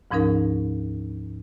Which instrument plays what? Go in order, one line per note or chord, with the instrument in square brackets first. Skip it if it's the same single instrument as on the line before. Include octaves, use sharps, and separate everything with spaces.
[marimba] D2 G#2 F3 C#4 D#4 A#4